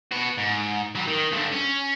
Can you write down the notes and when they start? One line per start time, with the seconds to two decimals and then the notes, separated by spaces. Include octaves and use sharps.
0.11 B2 F#4
0.37 G#2
0.95 F#3 G3
1.07 D#3
1.32 G2 D3
1.52 C#4